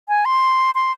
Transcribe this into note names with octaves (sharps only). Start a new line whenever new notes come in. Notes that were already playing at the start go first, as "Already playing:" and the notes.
G#5
C6
C6